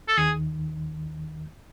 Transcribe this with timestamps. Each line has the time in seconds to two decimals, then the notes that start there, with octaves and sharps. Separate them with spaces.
0.08 A4
0.17 D#2 D#3 G#4